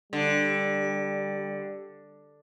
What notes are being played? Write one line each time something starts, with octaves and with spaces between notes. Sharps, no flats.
D3 G3